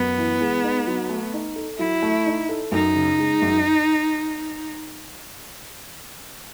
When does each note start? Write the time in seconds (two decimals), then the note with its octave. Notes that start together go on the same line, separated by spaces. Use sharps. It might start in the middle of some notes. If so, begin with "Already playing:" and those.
Already playing: F#2 B3
0.17 E3
0.41 G#3
0.64 D#4
0.87 F#3
1.09 A3
1.33 D#4
1.56 A4
1.79 F#3 E4
2.02 A3
2.26 D#4
2.49 A4
2.72 F#2 D#4
2.95 C#3
3.19 G#3
3.42 F#2